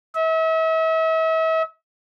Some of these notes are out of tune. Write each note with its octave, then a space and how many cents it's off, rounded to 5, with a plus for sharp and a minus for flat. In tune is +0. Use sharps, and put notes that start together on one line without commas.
E5 -40